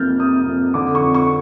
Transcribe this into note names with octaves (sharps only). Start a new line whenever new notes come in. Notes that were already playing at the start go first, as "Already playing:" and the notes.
Already playing: F2 C3 A#3 F6 G6 A6
C3 D#6
F2
D3 D6
C#6
F2
C#6